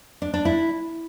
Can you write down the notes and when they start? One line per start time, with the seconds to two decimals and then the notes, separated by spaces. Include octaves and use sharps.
0.22 D4
0.34 D4
0.45 E4